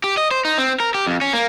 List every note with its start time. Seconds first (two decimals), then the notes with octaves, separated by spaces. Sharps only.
0.04 G4
0.17 D#5
0.31 C5
0.45 D#4
0.58 C4
0.80 A#4
0.95 G4
1.06 F2
1.21 C#4
1.33 A#3